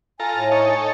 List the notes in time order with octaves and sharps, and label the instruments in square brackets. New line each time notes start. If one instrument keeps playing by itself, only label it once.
[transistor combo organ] F4 A4 A#5 [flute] G#5
[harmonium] A2
[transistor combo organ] D#4 A4 C#5